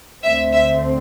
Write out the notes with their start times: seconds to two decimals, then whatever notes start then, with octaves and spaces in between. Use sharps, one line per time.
0.23 D2 D3 A3 C4 E5
0.53 E5